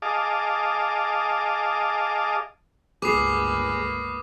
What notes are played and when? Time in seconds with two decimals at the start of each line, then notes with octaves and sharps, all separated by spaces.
0.02 G#4 D#5 F5 A5 D6
3.02 G1 C#2 A#3 G#4 B4 D6 D#6 C7